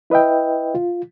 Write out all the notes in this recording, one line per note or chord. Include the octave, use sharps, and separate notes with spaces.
E4 B4 D#5 E5 G5
F4